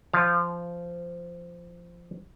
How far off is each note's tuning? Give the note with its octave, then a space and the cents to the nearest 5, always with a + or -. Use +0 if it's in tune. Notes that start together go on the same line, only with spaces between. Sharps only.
F3 -15 F5 +0